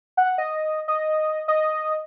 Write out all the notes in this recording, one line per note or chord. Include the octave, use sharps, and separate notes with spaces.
F#5
D#5
D#5
D#5